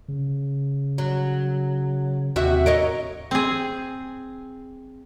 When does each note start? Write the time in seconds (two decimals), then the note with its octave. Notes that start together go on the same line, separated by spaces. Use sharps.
0.08 C#3
0.98 F#3
2.36 D#2 C3 F#4 E5
2.66 A#4 C#5 D#5
3.31 C4 G#4